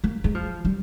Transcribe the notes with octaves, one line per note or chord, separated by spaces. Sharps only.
A#3
G#3
F3
G3